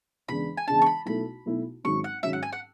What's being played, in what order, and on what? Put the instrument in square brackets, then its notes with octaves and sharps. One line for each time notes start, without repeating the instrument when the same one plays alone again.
[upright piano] E2 C#3 G#3 D4 [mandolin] B5
[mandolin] G#5
[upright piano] E2 C#3 G#3 D4 [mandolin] A5
[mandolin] C#6
B5
[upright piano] B1 B2 A3 E4 [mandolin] B5
[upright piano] B1 B2 A3 E4
[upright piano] G#1 G#2 F#3 C#4 [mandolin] C#6
[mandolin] F#5
[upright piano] G#1 G#2 F#3 C#4 [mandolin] E5
[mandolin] F#5
G#5
F#5